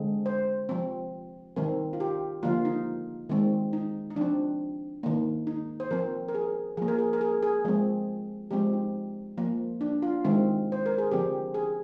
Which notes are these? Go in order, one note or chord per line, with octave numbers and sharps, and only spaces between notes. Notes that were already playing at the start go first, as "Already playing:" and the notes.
Already playing: D3 G#3 C4
C5
F3 C4
D#3 G3 C4 A#4
F4
G4
D3 F3 A#3 F4
D#4
D#3 G#3 C4
D#4
D#4
F3 C4 D4
D#3 A#3
D#4
C5
F3 C4 A#4
A#4
G#4
F3 A#3 G#4
A#4
G#4
A#4
G#4
G#4
F3 G#3 C4
F3 G#3 C4 G4
D#4
F3 A#3
D4
F4
D#3 G#3 C4
C5
A#4
G#4
D3 F3 C4 G4
G#4